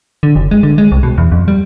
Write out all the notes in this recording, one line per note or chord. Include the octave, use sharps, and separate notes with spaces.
D3
F#1
G#3
D3
G#3
C2
B2
E2
F2
G3